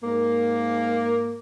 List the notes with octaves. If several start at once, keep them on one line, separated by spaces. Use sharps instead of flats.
G#2 A#3